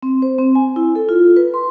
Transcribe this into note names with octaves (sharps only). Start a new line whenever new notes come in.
C4
C5
C4
G#5
E4
A4
F4
B4
C6